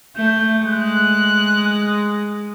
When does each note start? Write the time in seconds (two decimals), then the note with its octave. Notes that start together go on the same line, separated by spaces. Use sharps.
0.16 A3 G6
0.64 G#3 F#6